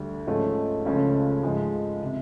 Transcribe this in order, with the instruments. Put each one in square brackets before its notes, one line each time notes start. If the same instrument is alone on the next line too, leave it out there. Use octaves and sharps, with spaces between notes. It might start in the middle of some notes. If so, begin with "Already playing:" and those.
Already playing: [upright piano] D2 D3 G3
G#2 F3 A3 C#4
C#2 C#3 F3 A3 C#4
G#2 F3 G#3
C3